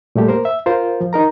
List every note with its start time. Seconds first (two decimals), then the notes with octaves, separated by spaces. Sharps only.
0.16 A#2 G3 A3 G4
0.28 A#3 A#4 C5
0.45 E5
0.66 F4 A#4 C5
1.01 F3
1.13 D#4 A#4 A#5